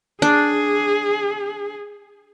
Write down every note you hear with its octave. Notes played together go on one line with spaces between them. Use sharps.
D4 G#4